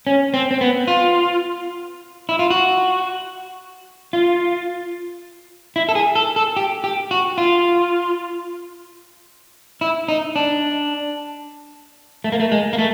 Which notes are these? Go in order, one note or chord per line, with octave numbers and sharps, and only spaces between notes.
C#4
C4
C4
B3
F4
E4
F4
F#4
F4
E4
A4
G#4
A4
A4
G4
G4
F#4
F4
E4
D#4
D4
A3
A#3
A3
G#3
A#3
A3